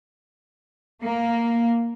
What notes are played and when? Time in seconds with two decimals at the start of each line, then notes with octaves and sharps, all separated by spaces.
1.02 A#3